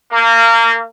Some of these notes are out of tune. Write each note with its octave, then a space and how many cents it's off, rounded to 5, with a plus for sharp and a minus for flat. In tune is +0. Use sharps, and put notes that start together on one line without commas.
A#3 -25